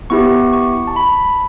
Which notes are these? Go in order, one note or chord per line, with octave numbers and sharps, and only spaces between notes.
B3 E4 G4 C#6
C#6
A5
B5